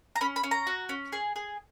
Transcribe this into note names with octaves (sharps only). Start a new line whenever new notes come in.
A#5
C#4 B5
B5
C#4
A#5
F#4
C#4
G#4
G#4